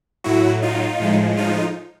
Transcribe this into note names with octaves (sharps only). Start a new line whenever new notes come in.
A2 F#3 E4 F#4
D#4 F4
A2 F3 G#3
D#4 F4